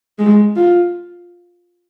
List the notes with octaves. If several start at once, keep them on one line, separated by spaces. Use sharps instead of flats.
G#3
F4